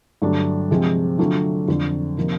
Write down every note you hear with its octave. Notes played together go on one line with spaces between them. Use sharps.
G2 D3 F#3 A3 D4
C3 F3 G#3
D3 F#3 A3 D4 F4
F2 D3 F3
C3 F3 A#3 D#4